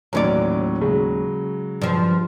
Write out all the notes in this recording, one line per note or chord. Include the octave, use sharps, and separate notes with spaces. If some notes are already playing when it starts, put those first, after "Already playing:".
D#2 A2 E3 F#3 C#4 D5
C#3 F#3 G#3
G2 F3